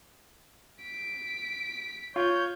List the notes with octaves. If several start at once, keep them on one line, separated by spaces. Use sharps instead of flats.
B6 D7
F4 C#5 G6